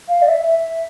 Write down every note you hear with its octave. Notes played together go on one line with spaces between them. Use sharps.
F5
D5
E5
E5